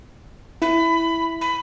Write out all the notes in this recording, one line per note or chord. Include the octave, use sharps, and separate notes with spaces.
E4 B5
B5